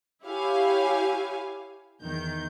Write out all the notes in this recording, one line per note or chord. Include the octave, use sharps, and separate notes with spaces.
E4 G4 C#5 F5 G#5
E2 D#3 G6